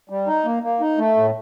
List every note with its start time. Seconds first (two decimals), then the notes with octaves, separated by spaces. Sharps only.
0.09 G3
0.27 D#4
0.45 A#3
0.63 A#3
0.80 D#4
0.98 A3
1.17 A2